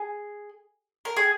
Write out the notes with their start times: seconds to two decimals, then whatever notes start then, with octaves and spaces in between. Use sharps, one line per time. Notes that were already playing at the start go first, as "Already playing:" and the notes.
Already playing: G#4
1.05 A#4
1.17 G#4